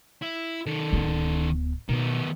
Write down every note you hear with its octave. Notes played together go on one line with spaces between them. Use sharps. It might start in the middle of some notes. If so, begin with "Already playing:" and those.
E4
D#3 A4
D1 B3
B2 D#3 B3